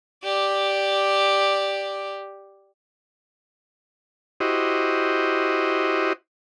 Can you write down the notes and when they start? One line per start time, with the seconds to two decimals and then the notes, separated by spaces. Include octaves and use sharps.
0.24 G4 D5
4.40 E4 F#4 G4 C5 D#5